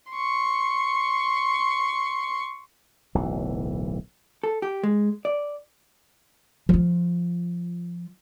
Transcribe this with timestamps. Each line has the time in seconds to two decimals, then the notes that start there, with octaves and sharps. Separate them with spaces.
0.11 C6 C#6
3.15 D1 B1 E3
4.43 A4
4.62 G4
4.83 G#3
5.25 D5
6.69 F3 F4